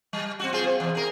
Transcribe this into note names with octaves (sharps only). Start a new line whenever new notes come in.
G3
C4 F#4
F4 G#4 C5
C4
E2 C3
G#4 A#4